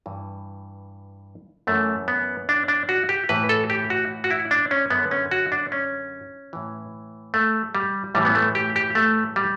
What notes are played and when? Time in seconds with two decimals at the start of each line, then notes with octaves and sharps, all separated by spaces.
0.06 G2 E3
1.67 F#2 E3 A3
2.08 B3
2.49 D4
2.68 D4
2.89 F#4
3.09 G4
3.29 A2 E3 B4
3.49 A4
3.70 G4
3.90 F#4
4.24 F#4
4.31 E4
4.51 D4
4.71 C#4
4.90 F#2 D3 B3
5.11 C#4
5.31 F#4
5.52 D4
5.72 C#4
6.53 A2 E3
7.34 A3
7.75 G3
8.15 A2 E3 G3
8.25 B3
8.35 A3
8.55 G4
8.76 G4
8.95 A3
9.36 G3